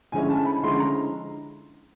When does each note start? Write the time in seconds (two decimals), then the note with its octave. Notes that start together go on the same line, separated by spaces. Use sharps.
0.12 D3 F3 G#3 C#4 E4 G#5
0.30 A5
0.46 B5
0.63 D3 F3 G#3 C#4 E4 C6
0.80 A#5